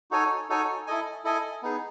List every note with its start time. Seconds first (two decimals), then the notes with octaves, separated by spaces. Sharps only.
0.11 D#4 F#4 A4 C#5 G#5
0.49 D#4 F#4 A4 C#5 G#5
0.87 E4 A4 D#5 G#5
1.24 E4 A4 D#5 G#5
1.63 B3 D#4 G#4